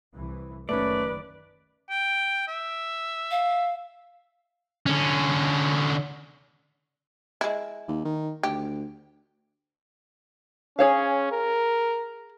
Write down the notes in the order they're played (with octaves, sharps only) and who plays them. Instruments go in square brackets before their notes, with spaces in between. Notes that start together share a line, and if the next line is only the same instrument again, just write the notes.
[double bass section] C2 E3
[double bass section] F#1 D#3 [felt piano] A3 C#4 [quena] B4 [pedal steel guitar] D5
[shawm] G5
E5
[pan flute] F5
[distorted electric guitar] D3 C#4
[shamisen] G#3 E4
[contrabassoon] D#2
D#3
[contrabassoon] D2 [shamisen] G4
[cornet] C#4 [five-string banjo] G#4 C#5 F5
[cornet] A#4